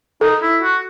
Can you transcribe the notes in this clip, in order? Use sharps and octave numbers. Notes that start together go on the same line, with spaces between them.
D#4 A4
E4
F#4